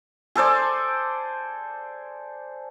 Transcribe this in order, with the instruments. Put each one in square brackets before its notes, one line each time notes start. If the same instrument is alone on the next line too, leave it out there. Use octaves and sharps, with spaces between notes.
[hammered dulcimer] G#4 A4 C5 D5